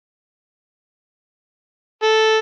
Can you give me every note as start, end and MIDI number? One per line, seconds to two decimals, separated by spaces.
2.03 2.37 69